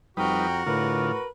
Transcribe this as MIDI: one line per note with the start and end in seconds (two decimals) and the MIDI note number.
0.17 0.65 41
0.17 0.47 55
0.17 0.47 63
0.17 1.24 66
0.17 0.47 71
0.17 0.63 79
0.17 0.63 82
0.17 0.63 89
0.66 1.14 45
0.66 1.12 50
0.66 1.12 65
0.66 1.27 70
0.66 1.27 71